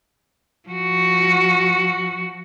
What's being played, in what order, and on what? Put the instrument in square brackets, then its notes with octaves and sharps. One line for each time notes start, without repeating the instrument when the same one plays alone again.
[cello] F3 F#4